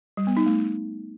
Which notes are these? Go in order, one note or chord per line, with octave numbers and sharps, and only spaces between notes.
G3
B3
D#4
A3